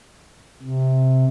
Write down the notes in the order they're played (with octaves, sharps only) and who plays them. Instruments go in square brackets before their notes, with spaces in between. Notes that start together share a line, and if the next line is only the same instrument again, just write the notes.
[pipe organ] C3